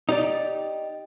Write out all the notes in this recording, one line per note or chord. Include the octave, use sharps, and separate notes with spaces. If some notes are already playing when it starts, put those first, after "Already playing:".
D#4 G4 D5